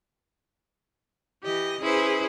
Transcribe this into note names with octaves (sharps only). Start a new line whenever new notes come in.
E3 G4 D#5
C#4 E4 G#4 B4 C5